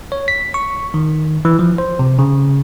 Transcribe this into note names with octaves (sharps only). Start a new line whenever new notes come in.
C#5
B6
C#6
D#3
E3
F3
C5
C3
C#3